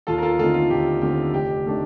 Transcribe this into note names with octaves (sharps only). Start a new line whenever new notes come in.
D#2 F4 A4
A#4
F4 A4
D3 A3 C4 D#4 F4 A4
F4
D#2 G4
D3 A3 C4 D#4 G4
F1 G4
D#3 A3 D4